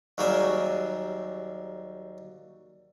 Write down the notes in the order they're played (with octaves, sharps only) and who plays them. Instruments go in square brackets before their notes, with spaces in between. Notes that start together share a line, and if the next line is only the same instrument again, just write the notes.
[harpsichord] D#2 F#3 G3 G#4 A#4 E5